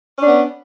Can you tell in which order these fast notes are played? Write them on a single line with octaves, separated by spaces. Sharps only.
C#4 D4 B3